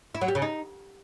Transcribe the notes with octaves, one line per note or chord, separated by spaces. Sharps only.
E4
F#3
G3
C#3
D#4